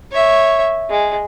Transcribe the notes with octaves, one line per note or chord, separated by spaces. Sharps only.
C#5 E5
G#3